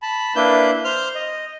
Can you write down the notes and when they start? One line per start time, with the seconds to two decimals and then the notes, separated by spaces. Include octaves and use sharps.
0.02 A5 B5
0.36 A#3 D4 E4 B4 G6
0.85 C5 F6 G6
1.15 D#5